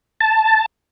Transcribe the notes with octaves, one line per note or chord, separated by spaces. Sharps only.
A5